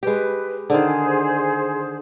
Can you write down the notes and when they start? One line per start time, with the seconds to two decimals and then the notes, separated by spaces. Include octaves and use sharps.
0.03 G#3 G4 B4
0.70 D3 D#3 G#4 C5